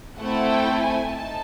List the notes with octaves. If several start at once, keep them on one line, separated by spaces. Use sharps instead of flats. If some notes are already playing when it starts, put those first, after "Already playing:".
A3 C4 E4 A4 F#5
G5
G#5
D#4 A5